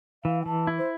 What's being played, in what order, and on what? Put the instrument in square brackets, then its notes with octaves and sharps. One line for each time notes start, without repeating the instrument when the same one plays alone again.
[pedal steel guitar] E3 [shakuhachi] F5
[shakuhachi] G5
[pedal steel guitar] E3 [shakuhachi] A5
[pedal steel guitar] E4
[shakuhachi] C5